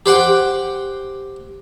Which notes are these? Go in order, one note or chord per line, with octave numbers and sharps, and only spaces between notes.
G4 C5 F#5 G5